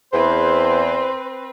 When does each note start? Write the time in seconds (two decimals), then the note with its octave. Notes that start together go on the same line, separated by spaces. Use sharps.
0.13 E2 C4 B4 C5